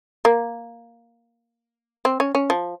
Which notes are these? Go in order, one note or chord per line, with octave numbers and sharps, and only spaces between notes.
A#3
C4
C#4
C#4
F3